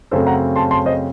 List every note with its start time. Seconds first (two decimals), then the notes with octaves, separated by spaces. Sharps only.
0.11 F#2 C#3 A3 C4 A4 C5
0.27 F#5 A#5
0.56 A5 C6
0.71 A5 C6
0.86 C5 D#5